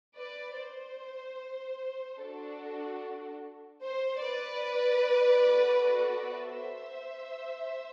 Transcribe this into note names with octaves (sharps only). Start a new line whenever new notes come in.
B4 D5
C5
D4 F#4 A4
C5
B4 D5
B3 F#4 A4
C5 E5